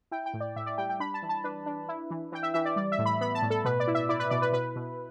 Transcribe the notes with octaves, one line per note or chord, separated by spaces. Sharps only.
E4 G5
G5
A2
D5
A2 E5
D5
G3 G5
G5
D4 B5
A5
E3
A5
D4 B4
D4
E4
E3
E3 G5
E5
E3 E5
D5
G3 D5
E5
A2
B5
B3 B5
A5
A2
A4
B2 B4
D5
E4
E5
E4 D5
B4
B2 D5
B4
B2 B4
B2